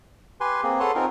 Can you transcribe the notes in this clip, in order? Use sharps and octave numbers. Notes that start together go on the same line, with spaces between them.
G4 B4 G#5 C6
A#3 C4 G#4
A4 B4 C#5 F#5 A5 C6
C4 D#4 F4 G#4 A#4